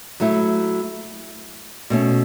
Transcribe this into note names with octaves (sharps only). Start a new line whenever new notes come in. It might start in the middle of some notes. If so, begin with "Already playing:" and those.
F#3 A3 E4
B2 A3 C#4